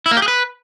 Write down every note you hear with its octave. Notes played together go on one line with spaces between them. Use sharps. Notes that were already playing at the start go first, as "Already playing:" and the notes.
E4
A#3
G4
G#4
B4